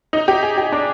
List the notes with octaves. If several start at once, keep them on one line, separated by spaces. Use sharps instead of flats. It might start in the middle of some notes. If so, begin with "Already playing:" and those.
D#4
G4
G#4
G4
D4